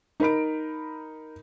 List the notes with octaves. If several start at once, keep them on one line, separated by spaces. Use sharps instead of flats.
D#4 A#4 B5 D7